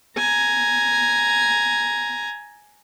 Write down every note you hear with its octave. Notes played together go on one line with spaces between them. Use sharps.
G#5 A#5